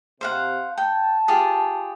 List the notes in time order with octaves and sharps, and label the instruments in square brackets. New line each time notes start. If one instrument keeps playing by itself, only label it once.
[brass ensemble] C3 [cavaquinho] C5 F5 F#5
[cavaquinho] G5 [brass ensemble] A5
[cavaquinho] F4 G4 G#4